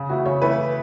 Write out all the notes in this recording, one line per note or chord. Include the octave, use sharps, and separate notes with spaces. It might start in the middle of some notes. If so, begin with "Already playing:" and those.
Already playing: C#3
E3 A3 E4 F#4
C#3 C#5
E3 A3 E4 B4